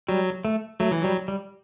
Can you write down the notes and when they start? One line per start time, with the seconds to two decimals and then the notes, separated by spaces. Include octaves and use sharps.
0.08 F#3 G3
0.45 A3
0.80 F#3 A3
0.92 E3
1.03 F#3 G3
1.28 G3